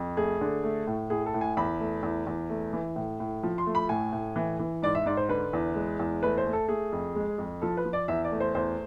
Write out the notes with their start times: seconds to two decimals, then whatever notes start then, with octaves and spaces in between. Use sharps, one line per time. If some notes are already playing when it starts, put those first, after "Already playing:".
Already playing: F2
0.17 A3 G#4
0.41 D3
0.64 A3
0.88 A2
1.10 A2 G#4
1.26 A4
1.34 A2
1.41 G#5
1.57 E2 B5
1.80 A3
2.03 E2
2.27 E2
2.50 A3
2.73 E3
2.96 A2
3.20 A2
3.43 F3
3.58 C6
3.66 A3
3.75 B5
3.89 A2 G#5
4.13 A2
4.36 E3
4.59 E3
4.83 G#2 D5
4.95 E5
5.06 G#2 D5
5.17 C5
5.29 D3 B4
5.53 E2
5.76 G#3
5.99 E2
6.23 A3 B4
6.38 C5
6.46 A3
6.53 A4
6.69 A3 G#4
6.92 F2
7.15 G#3
7.38 F2
7.62 F3 A4
7.77 B4
7.85 F3
7.93 D5
8.08 E2 E5
8.24 D5
8.32 A3
8.40 C5
8.55 E2 C5